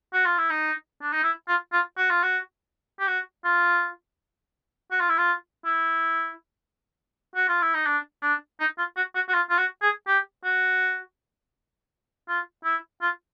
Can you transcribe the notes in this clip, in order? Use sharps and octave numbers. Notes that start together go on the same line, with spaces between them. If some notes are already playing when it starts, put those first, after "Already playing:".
F#4
F4
E4
D#4
D4
D#4
E4
F4
F4
F#4
F4
F#4
G4
F#4
F4
F#4
F4
E4
F4
E4
F#4
F4
E4
D#4
D4
D4
D#4
F4
F#4
F#4
F#4
F4
F4
F#4
G#4
G4
F#4
F4
E4
F4